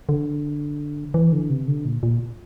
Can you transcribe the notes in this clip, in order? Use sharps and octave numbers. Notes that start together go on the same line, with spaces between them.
D3
E3
D3
C3
D3
A#2
A#2